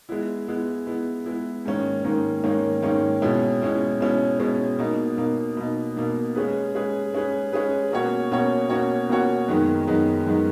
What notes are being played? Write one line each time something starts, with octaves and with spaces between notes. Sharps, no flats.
G#3 B3 E4
G#3 B3 E4
G#3 B3 E4
G#3 B3 E4
G#2 D#3 A#3 C#4
G#2 D#3 A#3 C#4
G#2 D#3 A#3 C#4
G#2 D#3 A#3 C#4
B2 G#3 C#4 E4
B2 G#3 C#4 E4
B2 G#3 C#4 E4
B2 G#3 C#4 E4
B2 A#3 D#4
B2 A#3 D#4
B2 A#3 D#4
B2 A#3 D#4
G#3 C#4 G#4 B4
G#3 C#4 G#4 B4
G#3 C#4 G#4 B4
G#3 C#4 G#4 B4
B2 A#3 C#4 F#4 C#5
B2 A#3 C#4 F#4 C#5
B2 A#3 C#4 F#4 C#5
B2 A#3 C#4 F#4 C#5
F#2 D#3 G#3 B3 D#4
F#2 D#3 G#3 B3 D#4
F#2 D#3 G#3 B3 D#4